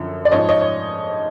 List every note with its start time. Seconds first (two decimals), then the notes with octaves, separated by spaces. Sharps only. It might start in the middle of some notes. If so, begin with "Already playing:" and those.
Already playing: F#2 D3 F3
0.25 D5
0.31 G#2 F3 C#5 D#5
0.49 C#5 D#5
0.61 C#5